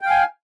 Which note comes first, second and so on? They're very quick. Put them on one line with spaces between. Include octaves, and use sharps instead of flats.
G5 F5 G#5